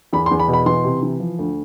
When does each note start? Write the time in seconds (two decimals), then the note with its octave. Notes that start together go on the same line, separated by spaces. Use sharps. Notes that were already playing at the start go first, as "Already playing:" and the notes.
0.13 E2 B5
0.26 C6
0.31 E2
0.39 B5
0.48 B2
0.53 B5
0.66 E3 C6
0.84 C3
1.03 E3
1.20 F3
1.39 D2